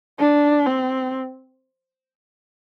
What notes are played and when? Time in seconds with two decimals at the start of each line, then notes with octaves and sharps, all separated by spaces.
0.19 D4
0.66 C4